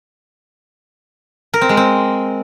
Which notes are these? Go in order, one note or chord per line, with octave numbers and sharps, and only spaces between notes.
A#4
C4
G#3
C4